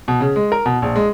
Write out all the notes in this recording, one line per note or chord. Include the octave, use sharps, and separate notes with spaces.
B2
C#3
G#3
A#4
B2
A#1
G#3